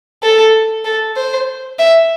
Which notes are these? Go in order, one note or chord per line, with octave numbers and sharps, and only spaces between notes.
A4
A4
C5
E5